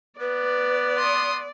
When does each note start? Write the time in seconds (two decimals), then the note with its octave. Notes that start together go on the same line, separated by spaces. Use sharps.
0.20 B3 B4 D5
0.98 C6 D#6